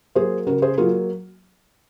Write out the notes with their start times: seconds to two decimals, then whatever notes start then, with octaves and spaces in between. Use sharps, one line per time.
0.15 F#3 A#3 G#4 C5
0.47 C#3 F#4 A#4
0.62 G#4 C5
0.78 F#3 A#3 F4 G#4